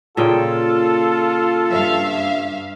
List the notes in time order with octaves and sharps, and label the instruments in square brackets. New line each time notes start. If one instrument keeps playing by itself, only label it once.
[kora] A#2 C#3 G5 [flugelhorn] F4 [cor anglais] A4
[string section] G2 E5 F5